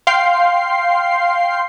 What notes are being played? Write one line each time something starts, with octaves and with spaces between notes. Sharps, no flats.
F5 G5 C6 C7